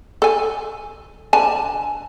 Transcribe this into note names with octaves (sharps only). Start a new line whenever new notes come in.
A4 G#5
D3 G#5 A5